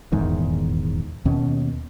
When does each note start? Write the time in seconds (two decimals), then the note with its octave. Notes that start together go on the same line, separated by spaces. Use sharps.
0.12 D#1 E2 G#2 D#3
1.25 D#2 B2 C#4